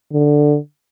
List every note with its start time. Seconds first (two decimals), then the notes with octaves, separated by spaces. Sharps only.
0.13 D3